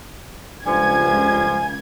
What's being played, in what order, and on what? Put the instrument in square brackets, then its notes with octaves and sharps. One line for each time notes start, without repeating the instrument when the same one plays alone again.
[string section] C#2 G#6 [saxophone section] G2 D3 F3 [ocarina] G#5